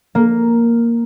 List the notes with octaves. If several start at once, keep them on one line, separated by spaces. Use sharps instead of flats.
A#3